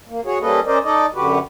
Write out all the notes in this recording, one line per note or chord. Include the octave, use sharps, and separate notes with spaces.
A#3
F#4 G#4 C#5
G3 A#3 C#4 A4 B4 D#5
C#4 A#4 C5 D5 D#5
D#4 A4 D5 D#5
F#2 D3 F#4 G4 B4